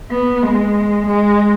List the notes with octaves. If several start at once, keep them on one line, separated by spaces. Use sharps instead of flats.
B3
G#3
G#3